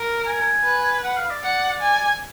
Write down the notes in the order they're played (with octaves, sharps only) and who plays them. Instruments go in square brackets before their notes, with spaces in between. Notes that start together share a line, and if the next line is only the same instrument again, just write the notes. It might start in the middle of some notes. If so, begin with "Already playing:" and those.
Already playing: [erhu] A#4
[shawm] G#5
[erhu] B4
[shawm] F#5
F5
D5
[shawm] D5 [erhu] F#5
[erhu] G#5